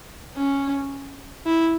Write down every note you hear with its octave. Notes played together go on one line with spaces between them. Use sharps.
C#4
E4